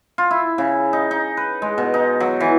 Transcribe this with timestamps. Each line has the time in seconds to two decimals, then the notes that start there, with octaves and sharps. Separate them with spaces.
0.18 F4
0.31 E4
0.58 C#3
0.93 D#4
1.11 D#4
1.37 B4
1.62 G#3
1.78 B2
1.94 D#4
2.20 F#3
2.40 E3